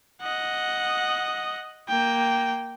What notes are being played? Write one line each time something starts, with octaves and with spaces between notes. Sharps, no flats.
D#5 F#5
A#3 G5